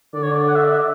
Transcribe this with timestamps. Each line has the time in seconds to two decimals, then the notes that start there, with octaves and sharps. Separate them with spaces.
0.14 D3 D5
0.23 C#5
0.32 D5
0.48 F#5
0.56 E5
0.64 D5
0.72 E5